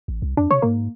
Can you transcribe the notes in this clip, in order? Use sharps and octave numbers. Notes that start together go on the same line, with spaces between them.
A1
C2
F2 D4
C3 C#5
G#2 A#3